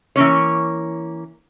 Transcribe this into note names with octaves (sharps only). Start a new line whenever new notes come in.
E3 A#3 C#4 C#5